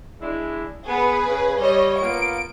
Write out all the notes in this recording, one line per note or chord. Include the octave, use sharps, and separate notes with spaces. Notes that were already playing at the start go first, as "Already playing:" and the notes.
G#3 D4 E4
B3 G#4 B4
C#3
G3 C#5 D#5
A#3 B3 F4 D7